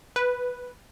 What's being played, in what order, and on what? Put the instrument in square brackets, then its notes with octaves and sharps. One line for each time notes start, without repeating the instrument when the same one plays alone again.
[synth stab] B4